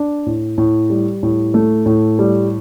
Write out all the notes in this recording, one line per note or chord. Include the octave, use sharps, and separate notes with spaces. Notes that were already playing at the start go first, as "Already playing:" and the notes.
Already playing: D4
A2
A2
G3
A2
A3
A2
G3